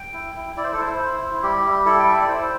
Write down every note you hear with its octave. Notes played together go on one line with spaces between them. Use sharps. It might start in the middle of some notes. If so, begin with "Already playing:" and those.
Already playing: G5
E4
E4
E4 D5
C5
A4
E4 C5
E4
E4
G3 G4
G3
E4 A4
G5
E4 E5
D5
E4 C5